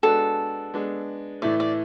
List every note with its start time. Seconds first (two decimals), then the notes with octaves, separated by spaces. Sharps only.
0.03 G#3 B3 D4 F#4 A4
0.74 G#3 B3 D4
1.42 A2 E3 A3 D5
1.60 D5